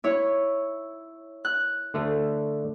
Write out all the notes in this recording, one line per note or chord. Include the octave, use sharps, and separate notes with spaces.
E4 C#5
F#6
D3 A3